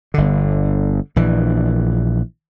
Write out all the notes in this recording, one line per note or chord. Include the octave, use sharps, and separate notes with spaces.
G1 D3
A#1 E3